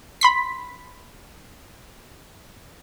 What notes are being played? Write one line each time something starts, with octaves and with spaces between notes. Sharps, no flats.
B5 C6 B6